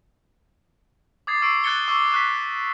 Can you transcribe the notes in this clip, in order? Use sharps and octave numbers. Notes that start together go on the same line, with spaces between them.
D6 D#6 G#6 A6 C7
C#6 E6 C7 D7
F#6 G#6 A6 C#7 G7
C#6 D6 E6
C#6 F#6 B6